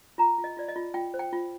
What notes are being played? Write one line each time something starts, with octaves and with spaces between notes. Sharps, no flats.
F4 A#5
F4
D#5
F4 D5
D#5
F4
F4 G5
C5
G5
F4